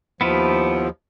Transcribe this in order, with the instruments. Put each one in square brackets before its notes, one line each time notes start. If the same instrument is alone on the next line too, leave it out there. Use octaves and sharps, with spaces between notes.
[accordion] D#2 F3 [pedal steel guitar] B3 E4 F4